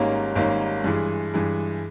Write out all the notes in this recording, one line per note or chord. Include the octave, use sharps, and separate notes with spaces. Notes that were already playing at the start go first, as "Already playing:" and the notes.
Already playing: G#1 G#2 G3 A#3 C#4
G#1 G#2 G3 A#3 C#4
G2 E3 G#3
G2 E3 G#3